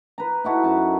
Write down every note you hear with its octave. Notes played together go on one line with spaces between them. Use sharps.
B4 A#5
D#4 E4 F#4 A4
F#2 A5